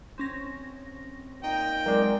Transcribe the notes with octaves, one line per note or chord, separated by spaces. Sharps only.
C4 C#4 A#6
A#2 D#4 G5
F#3 G#3 C4 A#4 D5